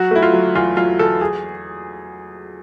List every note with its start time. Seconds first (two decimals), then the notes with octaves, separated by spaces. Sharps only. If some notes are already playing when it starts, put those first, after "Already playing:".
Already playing: F#3 F#4
0.11 A3 E4
0.23 F4
0.33 F#3
0.55 E2 F4
0.77 F#3 F4
0.99 E2 A4
1.21 G#4